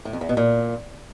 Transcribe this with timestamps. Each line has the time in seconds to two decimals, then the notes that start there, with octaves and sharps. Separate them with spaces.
0.05 A2
0.13 F2
0.21 E2
0.29 B2
0.37 A#2